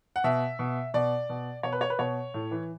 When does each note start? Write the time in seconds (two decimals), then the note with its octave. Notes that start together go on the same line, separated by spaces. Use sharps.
0.16 F#5
0.24 B2 E5
0.59 B2
0.94 B2 D5
1.29 B2
1.63 B2 C#5
1.72 B4
1.81 C#5
1.90 B4
1.99 B2 C#5
2.34 A2
2.51 E3